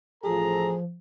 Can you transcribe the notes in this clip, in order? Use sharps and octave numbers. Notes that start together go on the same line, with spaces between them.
A1 F3 G#4 A4 A#5